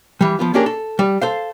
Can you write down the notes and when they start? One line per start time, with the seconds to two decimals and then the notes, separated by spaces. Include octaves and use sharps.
0.21 E3 G3
0.39 F3 B3 F4
0.54 A#3 C#4 D4 G4 G#4 A#4
0.66 A4
0.99 G3
1.22 A4 C5 F5